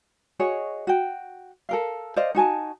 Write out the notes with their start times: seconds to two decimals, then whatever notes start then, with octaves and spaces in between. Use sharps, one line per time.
0.39 F#4 G#4 C#5 D#5
0.87 F#4 G5
1.69 A4 A#4 F5
2.16 C5 D5 D#5 F5
2.35 D#4 F#4 G#5 A5